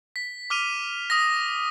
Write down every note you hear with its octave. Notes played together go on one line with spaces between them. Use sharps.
B6
D6 F6 D#7 F7
D#6 A#6